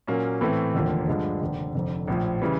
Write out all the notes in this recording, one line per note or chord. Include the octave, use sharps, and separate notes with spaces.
A#2 F#3 A#3 C#4
A2 E3 A3 C4
E1 D#2 D3 F3 A#3
G2 D3 F3 G#3
F1 D#2 D3
F1 F2 D3
A#1 A2 F3
C#3 E3 G3